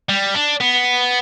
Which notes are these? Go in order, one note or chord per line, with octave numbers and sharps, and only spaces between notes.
G3
D4
B3